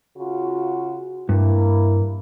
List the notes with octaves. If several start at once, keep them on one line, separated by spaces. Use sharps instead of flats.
C#3 F4 F#4
G2 A#3 E4